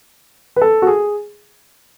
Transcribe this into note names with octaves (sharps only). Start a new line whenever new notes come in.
B4
A4
F#4
G#4